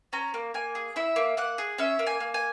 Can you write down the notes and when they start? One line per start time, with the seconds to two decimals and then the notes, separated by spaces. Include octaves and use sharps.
0.13 C#4 A#5
0.34 A#3
0.54 A#3 G#5
0.75 G#4
0.96 E4 E5
1.16 A#3
1.37 A#3 F#5
1.58 G#4
1.78 C#4 E5
1.99 A#3
2.07 G#5
2.20 A#3
2.34 G#5